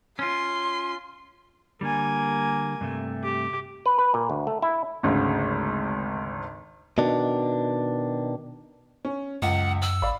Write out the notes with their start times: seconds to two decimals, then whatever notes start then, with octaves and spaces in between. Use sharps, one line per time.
0.19 C#4 F4 C6
1.81 D3 G3 A#3 G#5
2.81 G2 C3 A3
3.24 G4
3.86 B4
3.99 B4
4.14 A#2
4.30 D2
4.47 A3
4.62 E4
5.03 G#1 D2 C#3
6.98 B2 D#3 D4
9.05 C#4
9.42 C#2 F#2 F#5
9.82 E6 F#7
10.02 G#1 D5 F5 B5